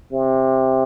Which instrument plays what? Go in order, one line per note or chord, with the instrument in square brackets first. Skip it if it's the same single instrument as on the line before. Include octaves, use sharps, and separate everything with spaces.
[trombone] C3